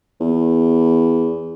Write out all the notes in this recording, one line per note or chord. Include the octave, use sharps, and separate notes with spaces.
E2